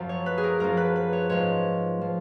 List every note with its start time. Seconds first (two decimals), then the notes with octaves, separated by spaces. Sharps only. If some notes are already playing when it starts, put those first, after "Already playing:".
Already playing: F#2 F3
0.09 C#5
0.26 B4
0.38 G#4
0.43 A#4
0.60 F#2 F3 A#4
0.77 B4
0.96 B4
1.13 C#5
1.29 G#2 F3 C#5
2.01 F3